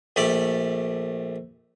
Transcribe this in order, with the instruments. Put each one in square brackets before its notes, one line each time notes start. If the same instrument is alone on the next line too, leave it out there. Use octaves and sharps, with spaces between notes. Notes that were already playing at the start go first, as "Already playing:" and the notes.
[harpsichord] A#1 A3 G4 D5